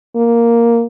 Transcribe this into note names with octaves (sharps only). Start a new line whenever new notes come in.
A#3